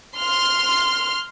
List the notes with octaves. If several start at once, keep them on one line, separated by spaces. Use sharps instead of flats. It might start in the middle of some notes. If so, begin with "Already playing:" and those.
C6 F6